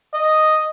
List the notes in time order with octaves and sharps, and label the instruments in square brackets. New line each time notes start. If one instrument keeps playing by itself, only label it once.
[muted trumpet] D#5